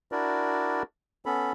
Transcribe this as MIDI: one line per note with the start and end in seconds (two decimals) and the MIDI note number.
0.12 0.83 62
0.12 0.83 64
0.12 0.83 66
0.12 0.83 70
0.12 0.83 74
1.26 1.53 59
1.26 1.53 61
1.26 1.53 69
1.26 1.53 83